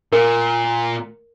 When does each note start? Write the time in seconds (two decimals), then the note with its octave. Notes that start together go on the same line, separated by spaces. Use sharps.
0.13 A#2 A#4